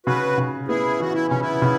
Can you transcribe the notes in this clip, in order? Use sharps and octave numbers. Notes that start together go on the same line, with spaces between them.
C#3 F#4 B4
C#3
B3 E4 G#4
E3 F#4
E4
C#3 C#4
B3 E4
C#3